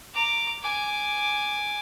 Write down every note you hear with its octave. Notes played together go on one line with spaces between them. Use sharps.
A#5 D6
G#5 D6